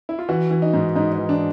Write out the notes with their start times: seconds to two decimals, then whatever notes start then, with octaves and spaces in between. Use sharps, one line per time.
0.09 E4
0.19 F4
0.29 E3 F#4
0.51 E3
0.62 D#4
0.73 G#2
0.96 G#2 D#4
1.12 D#4
1.18 E3
1.29 D4